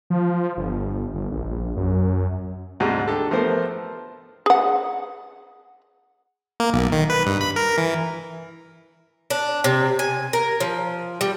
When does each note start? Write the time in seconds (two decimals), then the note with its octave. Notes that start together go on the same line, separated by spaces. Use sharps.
0.10 F3
0.57 G1
1.14 G1
1.32 A#1
1.76 F#2
2.80 D2 G#2 C3 G3 G#3
3.08 D4 G4 A4
3.31 F3 A3 B3 A#4 C5
4.46 G#4 F#5
6.60 A#3
6.73 B1
6.92 D#3
7.10 B4
7.26 G2
7.41 B5
7.56 A#4
7.78 E3
9.30 D4
9.64 C3
9.99 G#5
10.33 A#4
10.60 F3
11.21 G3